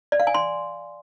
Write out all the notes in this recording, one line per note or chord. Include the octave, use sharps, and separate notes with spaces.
D5
F5
G#5
C6